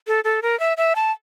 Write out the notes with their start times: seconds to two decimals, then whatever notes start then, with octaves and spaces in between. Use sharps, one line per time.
0.07 A4
0.24 A4
0.42 A#4
0.60 E5
0.77 E5
0.96 A5